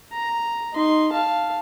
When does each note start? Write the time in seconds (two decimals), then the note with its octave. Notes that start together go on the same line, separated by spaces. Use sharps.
0.12 A#5
0.73 D#4 C6
1.12 F5 A5